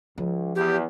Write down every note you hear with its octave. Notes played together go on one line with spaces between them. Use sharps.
C#2 F3
E2 G4